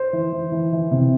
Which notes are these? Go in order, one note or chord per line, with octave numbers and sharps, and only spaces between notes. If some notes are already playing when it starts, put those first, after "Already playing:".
Already playing: C5
E3
E3
E3
E3
C3